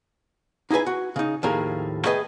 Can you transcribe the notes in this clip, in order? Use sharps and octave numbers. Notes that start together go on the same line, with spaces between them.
D#4 E4 G#4 B4 G#5
F#4
C#3 D#4
D#2 A2 F3 G#4 A#4
A3 G#4 B4 D#5 G5